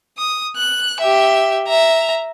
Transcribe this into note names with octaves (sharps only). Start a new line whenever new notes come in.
D#6
F#6
G4 E5
E5 A#5